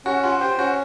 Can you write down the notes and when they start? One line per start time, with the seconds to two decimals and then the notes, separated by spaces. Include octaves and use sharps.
0.05 C#4 F#4
0.23 F4 F#4
0.41 G4 C5
0.58 C#4 F#4